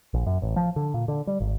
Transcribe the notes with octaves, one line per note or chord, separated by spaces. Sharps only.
A#1
F#2
A1
F3
D3
A#2
D3
G3
G#1